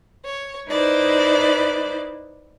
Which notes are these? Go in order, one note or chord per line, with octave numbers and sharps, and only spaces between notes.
C#5
D#4 E4 B4 C5 D5